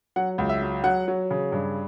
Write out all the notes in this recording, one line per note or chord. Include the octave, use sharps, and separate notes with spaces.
F#3 F#5
C#2
E5
F#3
F#3 F#5
F#3
C#3
G2